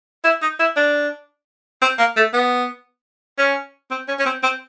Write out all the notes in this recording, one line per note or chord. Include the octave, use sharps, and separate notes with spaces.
E4
D#4
E4
D4
C4
A#3
A3
B3
C#4
C4
C#4
C#4
C4
C4